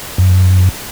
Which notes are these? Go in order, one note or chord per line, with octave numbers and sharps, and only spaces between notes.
F#2